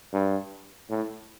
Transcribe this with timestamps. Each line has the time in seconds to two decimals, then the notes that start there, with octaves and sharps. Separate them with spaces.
0.13 G2
0.90 A2